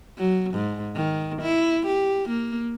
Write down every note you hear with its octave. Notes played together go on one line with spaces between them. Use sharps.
F#3
G#2
D#3
E4
G4
A#3